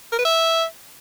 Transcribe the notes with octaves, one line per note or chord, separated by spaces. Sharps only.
A#4
B4
E5